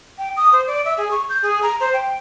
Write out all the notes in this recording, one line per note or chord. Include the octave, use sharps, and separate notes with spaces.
G5
D#6
C5
D5
E5
G#4
C#6
G6
G#4
A#5
C5
G5